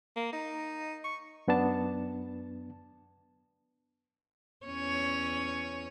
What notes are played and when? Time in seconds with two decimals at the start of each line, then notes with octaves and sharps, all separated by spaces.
0.16 A#3
0.33 D#4
1.04 C#6
1.48 F#2 B3 D4 A5
4.66 E2 C#4 C#5